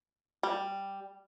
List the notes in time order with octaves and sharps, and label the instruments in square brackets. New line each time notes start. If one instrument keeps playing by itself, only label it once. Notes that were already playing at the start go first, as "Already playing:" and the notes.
[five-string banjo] G3